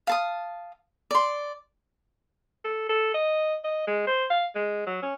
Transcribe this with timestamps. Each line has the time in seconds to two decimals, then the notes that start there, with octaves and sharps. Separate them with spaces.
0.07 F5 A5 D#6
1.11 D5 C6
2.64 A4
2.89 A4
3.14 D#5
3.64 D#5
3.87 G#3
4.07 C5
4.30 F5
4.56 G#3
4.87 F#3
5.03 C#4